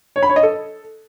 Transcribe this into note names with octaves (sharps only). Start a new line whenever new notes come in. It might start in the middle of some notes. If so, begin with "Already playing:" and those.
C#5
B5
C#5
D#5
A4